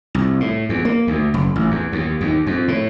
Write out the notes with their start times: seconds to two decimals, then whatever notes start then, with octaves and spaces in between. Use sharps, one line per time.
0.15 C2
0.40 A2
0.69 E2
0.85 A#3
1.07 D2
1.34 F#1
1.56 A1
1.71 E2
1.92 D#2
2.21 D#2
2.46 F2
2.68 A2